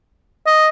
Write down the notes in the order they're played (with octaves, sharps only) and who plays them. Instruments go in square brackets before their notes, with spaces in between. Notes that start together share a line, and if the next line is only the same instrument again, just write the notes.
[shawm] D#5